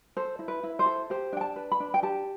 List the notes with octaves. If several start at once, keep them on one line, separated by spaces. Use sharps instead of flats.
A4 C5
E4
B4
E4
C5
A4
G4 C5
D4 G5
A5
B4
B5
D4
G5
G4 A5